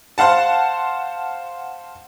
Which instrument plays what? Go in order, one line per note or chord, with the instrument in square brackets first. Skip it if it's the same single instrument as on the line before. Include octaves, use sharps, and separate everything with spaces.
[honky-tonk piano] C5 F5 F#5 A5